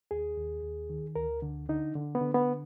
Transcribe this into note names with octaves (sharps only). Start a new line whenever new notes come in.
D#2 G#4
D#2
D#2
D#3
D2 A#4
D3
D3 D#4
D3
B3
D3
B3